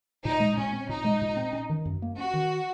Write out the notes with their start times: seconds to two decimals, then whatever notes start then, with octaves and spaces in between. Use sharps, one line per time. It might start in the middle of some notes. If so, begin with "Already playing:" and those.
0.24 A#2 D#4
0.40 G#3
0.57 A#2 C#4
0.73 C4
0.89 A#2 D#4
1.05 G#3
1.22 A#2
1.37 C4
1.53 C#4
1.69 D#3
1.85 F#2
2.02 A#3
2.17 C#4 F#4
2.33 D#3